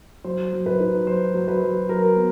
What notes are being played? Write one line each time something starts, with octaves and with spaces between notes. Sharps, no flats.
F#3 C5
F#3
B4
D#4
F#3 C5
F#3
B4
F#3
F#3 A#4
B3